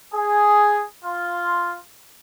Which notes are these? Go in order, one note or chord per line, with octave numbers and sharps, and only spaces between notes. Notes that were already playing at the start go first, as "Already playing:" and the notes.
G#4
F4